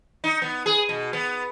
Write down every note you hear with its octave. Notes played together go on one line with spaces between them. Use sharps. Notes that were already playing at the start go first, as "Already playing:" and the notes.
D#4
B3
G#4
B2
B3